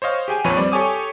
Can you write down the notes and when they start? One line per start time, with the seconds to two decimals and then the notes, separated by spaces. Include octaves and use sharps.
0.02 C5 C#5 D#5 F5
0.28 G4 G#4 G5 G#5
0.44 A#1 F2 F3 B4 C#5 D#7
0.57 G3 C4 D5
0.72 G4 A4 C#5 G#5 D6 D#6